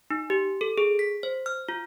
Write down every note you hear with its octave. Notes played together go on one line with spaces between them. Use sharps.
D#4
G4
A4
G#4
B6
C5
F6
F4